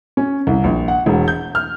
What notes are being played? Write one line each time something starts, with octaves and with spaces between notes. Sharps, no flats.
C#4
C2
A#1
F#5
E1
G6
F6